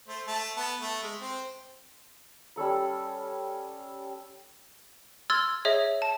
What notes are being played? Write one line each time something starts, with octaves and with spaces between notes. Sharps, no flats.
A3 C5
A3 A5
B3 A5
A3
G#3
C4
G3 C#4 A4 B5
C6 E6 F6 G#6 A6
G#4 C#5 D#5 E5
A5